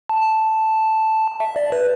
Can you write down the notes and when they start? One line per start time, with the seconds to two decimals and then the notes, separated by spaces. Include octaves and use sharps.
0.09 A5
1.40 E5
1.56 D5
1.72 B4